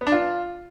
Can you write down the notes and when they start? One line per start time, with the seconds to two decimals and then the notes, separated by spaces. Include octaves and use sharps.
0.01 B3
0.07 D4
0.12 F4